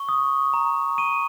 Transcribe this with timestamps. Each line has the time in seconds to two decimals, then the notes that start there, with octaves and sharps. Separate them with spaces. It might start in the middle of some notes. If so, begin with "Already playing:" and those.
Already playing: C#6
0.09 D#6
0.53 A#5
0.98 C#6 D#7